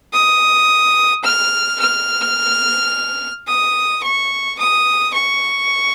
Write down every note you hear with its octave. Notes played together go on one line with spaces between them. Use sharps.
D#6
F6
F6
D#6
C#6
D#6
C#6